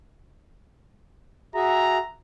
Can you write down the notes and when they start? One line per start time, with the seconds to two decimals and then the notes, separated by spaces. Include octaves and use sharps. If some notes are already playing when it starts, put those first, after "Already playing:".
1.55 F#4 G#4 E5 A#5